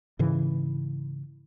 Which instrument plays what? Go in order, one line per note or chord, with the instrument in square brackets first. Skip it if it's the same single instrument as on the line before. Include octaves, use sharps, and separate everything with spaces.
[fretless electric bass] G#2 C#3 E3